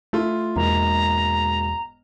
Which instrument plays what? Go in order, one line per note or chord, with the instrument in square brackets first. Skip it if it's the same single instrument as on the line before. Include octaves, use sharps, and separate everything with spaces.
[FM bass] A3 [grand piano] E4 F4
[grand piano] E1 G#2 A#3 [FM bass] E2 [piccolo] A#5